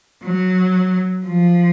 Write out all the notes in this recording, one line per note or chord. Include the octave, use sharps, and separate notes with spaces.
F#3
F3